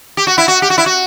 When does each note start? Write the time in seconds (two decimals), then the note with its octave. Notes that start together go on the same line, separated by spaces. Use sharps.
0.17 G4
0.27 F#4
0.38 E4
0.48 F#4
0.62 G4
0.70 F#4
0.78 E4
0.86 F#4